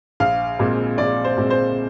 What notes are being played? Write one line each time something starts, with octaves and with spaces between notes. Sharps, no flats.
A#1 F5
A#2 G#3 C4
A#1 D5
C5
A#2 G#3 C4
C5